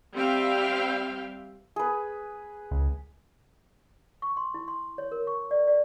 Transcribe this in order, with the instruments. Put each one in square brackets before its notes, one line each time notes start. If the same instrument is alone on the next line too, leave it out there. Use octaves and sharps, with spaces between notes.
[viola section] G3 C4 E5 F5 G5
[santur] G#4 B4
[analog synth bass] C#2
[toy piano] C#6
C6
E4
C6
C#5
A#4
C#6
D5
D5